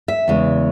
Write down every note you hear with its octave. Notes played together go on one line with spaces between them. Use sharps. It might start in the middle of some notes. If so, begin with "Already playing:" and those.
E5
E2 C#3 G#3